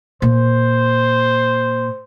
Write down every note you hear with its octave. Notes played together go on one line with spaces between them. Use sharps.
A#2 C5